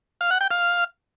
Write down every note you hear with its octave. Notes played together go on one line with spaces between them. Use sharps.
F5
F#5
G5
F5